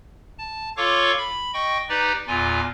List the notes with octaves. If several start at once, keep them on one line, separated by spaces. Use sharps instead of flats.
A5
F4 A4 C#5 F5 C#6 D6
B5
D#5 G5 C#6
D#4 G4 B4 D5
E2 A#2 F4 G#5